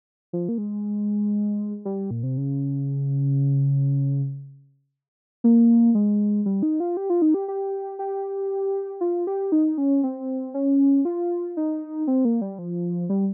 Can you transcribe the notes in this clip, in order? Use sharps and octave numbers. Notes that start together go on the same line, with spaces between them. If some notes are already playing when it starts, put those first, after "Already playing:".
F3
A#3
G#3
G3
A#2
C3
C#3
A#3
G#3
G3
D#4
F4
G4
F4
D#4
G4
G4
G4
F4
G4
D#4
C#4
C4
C#4
F4
D#4
C4
A#3
G3
F3
G3